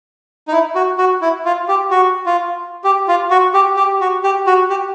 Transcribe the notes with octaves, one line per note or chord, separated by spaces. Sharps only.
D#4
E4
F#4
F#4
E4
F4
G4
F#4
F4
G4
F4
F#4
G4
G4
F#4
G4
F#4
G4